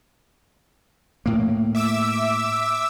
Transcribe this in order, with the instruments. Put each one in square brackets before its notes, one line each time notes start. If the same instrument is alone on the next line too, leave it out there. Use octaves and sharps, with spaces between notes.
[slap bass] A2 A#3
[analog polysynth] E5 D6 E6